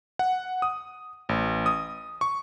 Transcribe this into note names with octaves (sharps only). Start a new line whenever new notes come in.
F#5
D#6
A1
D#6
C#6